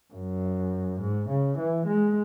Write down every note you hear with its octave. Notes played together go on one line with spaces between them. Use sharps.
F#2
G#2
C#3
E3
G#3